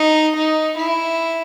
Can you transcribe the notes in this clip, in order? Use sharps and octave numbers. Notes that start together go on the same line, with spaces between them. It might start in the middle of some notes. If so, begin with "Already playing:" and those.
Already playing: D#4
D#4
E4